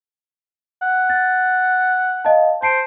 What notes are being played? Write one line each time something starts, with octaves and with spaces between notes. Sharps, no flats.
F#5
A6
D#5 F5 A5
C5 A5 C7 D7